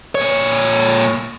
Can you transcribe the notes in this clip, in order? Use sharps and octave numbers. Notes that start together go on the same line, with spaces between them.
A#2 C#5